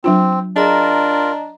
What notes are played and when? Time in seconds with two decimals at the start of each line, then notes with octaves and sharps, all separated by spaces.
0.04 F#3 C4 D4 F4
0.56 D4 F4 G#4 A#4 D#5 A#5